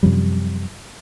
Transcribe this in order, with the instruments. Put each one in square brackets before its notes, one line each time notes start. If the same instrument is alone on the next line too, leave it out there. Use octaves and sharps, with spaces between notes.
[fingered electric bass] F#2 C3 F3 G3